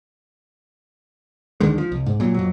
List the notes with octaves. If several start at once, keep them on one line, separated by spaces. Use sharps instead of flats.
D2 D3 D#3 G#3
F3
C2
G#2
A#2 F#3
F2 F#3